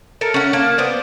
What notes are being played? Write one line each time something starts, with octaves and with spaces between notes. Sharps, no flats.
A4 A#4
C#4 F#5
A#3 A5
B3 C5 D5